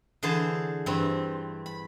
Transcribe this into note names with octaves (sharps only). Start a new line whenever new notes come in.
D3 E3 G#4 C5 A5
G2 E3 C4
B5